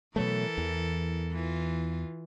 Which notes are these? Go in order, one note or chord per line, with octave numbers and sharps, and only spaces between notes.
B2 E3 F#3 A3 A4 A#4
E2
E3 F4